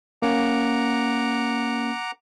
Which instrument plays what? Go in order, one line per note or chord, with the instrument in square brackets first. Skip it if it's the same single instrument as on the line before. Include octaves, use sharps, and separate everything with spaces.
[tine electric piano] A#3 C#4 [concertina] F#5 A#5 D6